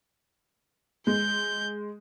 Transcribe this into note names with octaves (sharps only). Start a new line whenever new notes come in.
G#3 G6